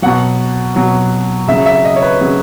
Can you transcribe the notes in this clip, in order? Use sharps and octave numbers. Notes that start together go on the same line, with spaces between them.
B2 F#3 F#5
B2 F#3
C#3 F#3 E5
E5
D#5
C#5
B4
C#3 F#3